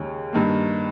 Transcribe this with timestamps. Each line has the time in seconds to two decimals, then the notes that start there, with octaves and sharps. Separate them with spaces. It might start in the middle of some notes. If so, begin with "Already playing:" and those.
Already playing: D#2 C#3 G#3 C#4
0.33 G2 D#3 A#3